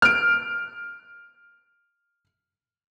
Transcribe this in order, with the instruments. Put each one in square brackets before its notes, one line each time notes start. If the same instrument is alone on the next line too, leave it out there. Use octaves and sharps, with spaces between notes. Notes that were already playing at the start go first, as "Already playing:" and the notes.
[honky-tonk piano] F6 D7